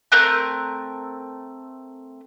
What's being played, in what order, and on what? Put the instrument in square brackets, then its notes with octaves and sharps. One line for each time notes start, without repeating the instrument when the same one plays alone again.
[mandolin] A3 C4 A#4 F#6